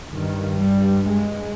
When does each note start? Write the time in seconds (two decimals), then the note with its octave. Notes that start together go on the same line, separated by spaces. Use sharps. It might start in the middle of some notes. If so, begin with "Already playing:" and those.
0.13 G2 D#3
0.61 G3
1.07 G#3